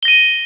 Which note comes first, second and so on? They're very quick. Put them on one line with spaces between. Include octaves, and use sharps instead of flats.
G7 A#6 D#7